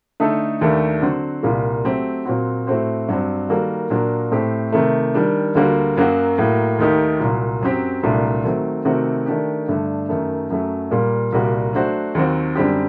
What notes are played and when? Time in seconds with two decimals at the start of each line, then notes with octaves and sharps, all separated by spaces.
0.20 D3 A3 D#4 A4
0.61 D#2 D#3 A3 D4 G4
1.02 D3 F#3 C4 F#4 C5
1.43 C2 A#2 G3 A#3
1.85 F#3 A3 C4 G4
2.25 A#2 F#3 C4 F#4
2.67 A2 A3 C4 F#4 C5
3.08 G2 F#3 C4
3.49 D#3 G3 A#3 F#4 A4
3.90 A#2 F#3 A#3 D4
4.32 A2 A3 C4 G4 C5
4.73 C3 D#3 A3
5.14 D#3 G3 D4
5.55 D2 D3 G3 A#3 F#4
5.97 F#2 F#3 A#3 F#4
6.38 A2 F#3 A#3
6.79 D#2 D#3 A3 D#4 G4
7.20 C2 A#2 F#3
7.61 F#2 F#3 C4 G4
8.03 C2 A#2 F#3 A3 D4
8.44 D#3 F#3 A3 C4
8.85 C3 D#3 A3 C4 F#4
9.26 D#3 A3 D4 G4
9.68 G2 D3 A3
10.09 F#2 D#3 A3
10.50 F#2 F#3 A3
10.91 A#2 G3 A#3
11.32 C2 A#2 G3 A#3 F#4
11.73 F#3 A3 D4 F#4 C5
12.15 D#2 D#3 F#3 C4 F#4
12.55 F#2 D3 G3 C4 G4